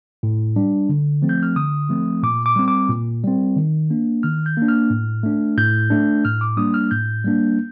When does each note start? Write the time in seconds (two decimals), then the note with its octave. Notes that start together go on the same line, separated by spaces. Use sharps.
0.23 A2
0.56 G3 D4
0.89 D3
1.22 F3 A3 C4
1.29 G6
1.43 F6
1.56 D3 D#6
1.89 F3 A3 C4
2.23 A#2 D6
2.46 D6
2.56 G3 C4
2.68 D6
2.89 A#2
3.24 G3 C4
3.56 D#3
3.90 A#3 D4
4.23 D#3 F6
4.46 G6
4.57 A#3 D4
4.68 F6
4.90 A2
5.23 A3 D4
5.58 A2 G6
5.90 A3 D4
6.25 A2 F6
6.41 D6
6.57 G3 A#3 D4 D#6
6.74 F6
6.91 A2 G6
7.24 G3 A#3 D4